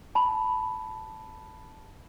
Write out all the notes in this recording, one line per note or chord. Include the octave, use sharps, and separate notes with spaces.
A5 B5